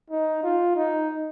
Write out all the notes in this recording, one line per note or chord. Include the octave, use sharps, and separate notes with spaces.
D#4
F4
D#4